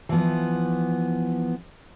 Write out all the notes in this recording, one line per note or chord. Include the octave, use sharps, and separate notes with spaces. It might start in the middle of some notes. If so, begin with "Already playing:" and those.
E3 F3 B3